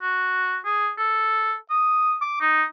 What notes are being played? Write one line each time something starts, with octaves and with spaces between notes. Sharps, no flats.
F#4
G#4
A4
D#6
D6
D#4